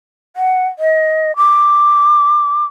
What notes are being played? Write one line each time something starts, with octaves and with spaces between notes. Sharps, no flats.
F#5
D#5
D6